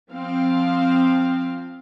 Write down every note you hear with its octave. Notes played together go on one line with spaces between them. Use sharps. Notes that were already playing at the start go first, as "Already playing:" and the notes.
F3 C4 F5